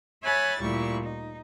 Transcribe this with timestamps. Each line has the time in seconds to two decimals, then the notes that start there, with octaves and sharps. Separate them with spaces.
0.23 C#5 E5 G#5 B5 F#6 A6
0.59 D2 A#2 G3 E4 C#6
1.03 D#4